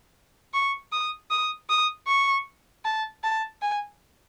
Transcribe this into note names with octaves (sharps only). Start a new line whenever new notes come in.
C#6
D#6
D#6
D#6
C#6
A5
A5
G#5